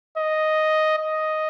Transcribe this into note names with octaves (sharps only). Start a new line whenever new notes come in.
D#5
D#5